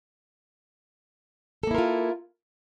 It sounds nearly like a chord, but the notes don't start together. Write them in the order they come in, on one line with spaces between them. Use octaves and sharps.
A4 A#3 E4 A#4 F4